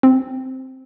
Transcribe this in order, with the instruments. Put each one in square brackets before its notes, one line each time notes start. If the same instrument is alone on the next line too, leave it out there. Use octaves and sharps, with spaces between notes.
[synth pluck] C4